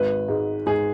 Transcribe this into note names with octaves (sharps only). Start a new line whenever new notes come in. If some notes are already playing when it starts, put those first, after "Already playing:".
Already playing: G#1 B4
G#2
G#2 G#4